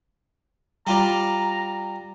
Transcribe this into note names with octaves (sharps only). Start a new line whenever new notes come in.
G3 F4 D5 A#5